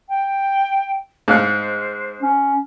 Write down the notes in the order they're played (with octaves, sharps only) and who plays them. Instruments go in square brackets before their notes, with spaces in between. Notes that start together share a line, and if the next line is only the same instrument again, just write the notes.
[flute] G5
[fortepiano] G#2 F5 F#6 [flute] C5
[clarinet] C#4